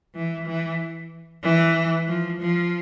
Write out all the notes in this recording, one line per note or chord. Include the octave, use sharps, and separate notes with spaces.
E3
E3
E3
F3
F3